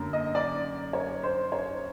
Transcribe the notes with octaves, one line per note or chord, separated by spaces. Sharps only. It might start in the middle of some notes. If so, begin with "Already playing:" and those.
Already playing: F#2 D3 A#3
D#5
D5
C#5
C5
C#5